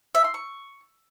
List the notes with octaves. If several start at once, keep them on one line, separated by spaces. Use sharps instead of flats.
E5
C6
C#6